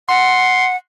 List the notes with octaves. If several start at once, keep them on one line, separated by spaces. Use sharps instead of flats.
F#5 C6